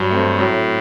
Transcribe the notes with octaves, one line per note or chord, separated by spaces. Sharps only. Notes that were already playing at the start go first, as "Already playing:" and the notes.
Already playing: G2 F#3
A3 C4
A2 F#3